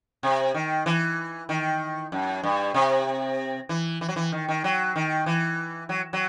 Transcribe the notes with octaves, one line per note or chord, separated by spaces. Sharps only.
C3
D#3
E3
D#3
F#2
G2
C3
E3
E3
F#3
E3
D#3
D#3
F#3
D#3
E3
F#3
F#3